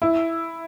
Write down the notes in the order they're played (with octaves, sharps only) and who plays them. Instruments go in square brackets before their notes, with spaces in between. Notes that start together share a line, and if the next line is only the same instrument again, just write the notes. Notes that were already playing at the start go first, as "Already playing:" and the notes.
[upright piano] E4